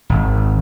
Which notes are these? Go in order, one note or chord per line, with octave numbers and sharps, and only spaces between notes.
G#1